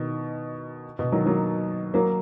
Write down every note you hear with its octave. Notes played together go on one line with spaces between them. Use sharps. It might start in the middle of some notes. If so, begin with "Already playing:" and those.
Already playing: B2 D#3
B2
D#3 F#3
F#3 A#3
F#3 A#3